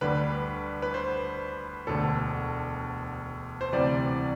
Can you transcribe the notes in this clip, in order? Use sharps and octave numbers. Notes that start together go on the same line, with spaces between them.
D2 D3 G3 B4
B4
C5
E1 D2 D3 A4
C5
D2 C3 E3 G3 D5